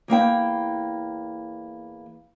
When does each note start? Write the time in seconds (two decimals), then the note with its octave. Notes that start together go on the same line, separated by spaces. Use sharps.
0.08 E2 A#3 E4 G5